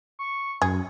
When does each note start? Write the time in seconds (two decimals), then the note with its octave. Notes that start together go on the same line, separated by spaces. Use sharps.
0.19 C#6
0.62 F#2 G#4